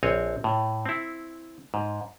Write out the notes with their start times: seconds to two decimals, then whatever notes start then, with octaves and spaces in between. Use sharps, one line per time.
0.03 A#1 C4 C#5 G#5
0.44 A2
0.86 C4 E4
1.74 G#2